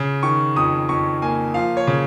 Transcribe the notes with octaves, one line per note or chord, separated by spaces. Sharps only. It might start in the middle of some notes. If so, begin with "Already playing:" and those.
Already playing: C#3
D#3 C#6
F2 D#6
F2 C#6
A#3 G#5
F3 F5
C#5
C#3